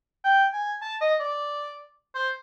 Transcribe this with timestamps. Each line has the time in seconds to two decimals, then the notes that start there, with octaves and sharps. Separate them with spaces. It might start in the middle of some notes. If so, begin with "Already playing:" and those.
0.24 G5
0.53 G#5
0.82 A5
1.01 D#5
1.20 D5
2.15 C5